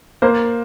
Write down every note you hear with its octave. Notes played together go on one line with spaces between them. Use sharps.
A#3 C5